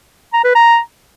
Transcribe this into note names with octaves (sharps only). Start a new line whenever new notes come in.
A#5
B4
A#5